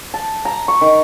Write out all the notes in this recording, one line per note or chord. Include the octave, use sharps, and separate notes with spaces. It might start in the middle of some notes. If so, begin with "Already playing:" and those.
A5
A#5
C#6
D#3